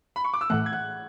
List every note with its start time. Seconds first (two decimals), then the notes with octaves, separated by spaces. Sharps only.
0.16 B5
0.24 C#6
0.34 D6
0.41 E6
0.50 A2 E3 A3 F#5 F#6
0.66 G#6
0.72 F#5 F#6